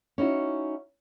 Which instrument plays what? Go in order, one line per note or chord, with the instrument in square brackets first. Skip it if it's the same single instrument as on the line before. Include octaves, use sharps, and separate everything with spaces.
[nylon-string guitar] C#4 D#4 E4 F#4